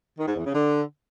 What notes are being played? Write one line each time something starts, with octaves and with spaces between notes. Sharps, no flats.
D#3
G#2
E2
C#3
D3